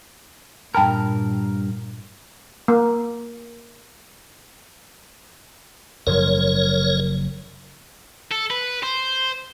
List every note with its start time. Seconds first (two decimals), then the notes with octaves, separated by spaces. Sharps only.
0.75 G2 A#2 A#4 G5 A5 B5
2.68 A#3
6.07 F#1 F#2 F3 A#4 C#5
8.31 A4
8.50 B4
8.83 C5